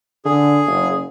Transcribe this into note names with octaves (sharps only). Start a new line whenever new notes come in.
D3 G#4
F#1